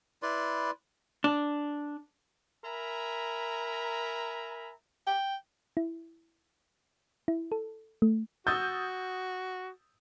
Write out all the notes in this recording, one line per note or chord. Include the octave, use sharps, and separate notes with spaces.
E4 B4 D5 C6
D4
A#4 E5 G#5 A#5 B5
G5
E4
E4
A4
A3
F#4 D#6 E6 G6 A6